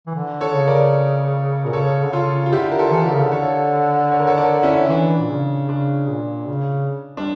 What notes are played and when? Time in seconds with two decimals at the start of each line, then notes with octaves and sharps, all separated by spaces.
0.07 E3
0.15 D3
0.41 A4 C#5
0.54 C#3
0.67 A#4 D5
1.65 A#2 A#4
1.73 C#3 A4 C#5
2.04 D3
2.13 C#3 F4 A4
2.46 F4
2.52 D3 E4 G4
2.71 A#4
2.79 F4 A4
2.92 E3 A4
3.02 D3 G4 A#4
3.12 C#3
3.22 D3
3.32 A4 C#5
4.11 C#5
4.19 A#4
4.27 A4 C#5
4.37 A#4 D5
4.63 C#4 E4
4.89 E3 D4
5.18 A#2
5.30 C#3
5.69 C#3 D4
6.09 A#2
6.48 C#3
7.17 G3 D4